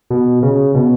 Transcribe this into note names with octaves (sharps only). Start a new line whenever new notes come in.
B2
C#3
B2